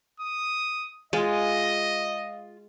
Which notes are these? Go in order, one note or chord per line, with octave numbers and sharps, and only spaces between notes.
D#6
G#3 F4 D#5